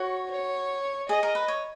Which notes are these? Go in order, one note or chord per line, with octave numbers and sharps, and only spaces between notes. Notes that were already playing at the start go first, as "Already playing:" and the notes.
Already playing: F#4 C#5
C#5
G#4 D#5
A#4
B4
C#5